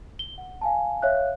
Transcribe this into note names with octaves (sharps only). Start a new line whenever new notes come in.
G7
F#5
F5 G#5 A5
C#5 E5 F5 F#6